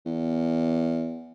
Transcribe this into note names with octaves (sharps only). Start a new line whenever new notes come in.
E2